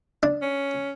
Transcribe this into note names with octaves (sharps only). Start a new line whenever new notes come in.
D4
C#4